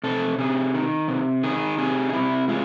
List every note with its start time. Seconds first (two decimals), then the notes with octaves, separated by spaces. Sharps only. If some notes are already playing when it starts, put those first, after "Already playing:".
0.04 C3 A4
0.38 C3 G#4
0.74 D#3
1.08 C3
1.43 D#3 G#4
1.78 C3 G#4
2.09 D#4
2.13 C3 E4
2.48 G#3 F4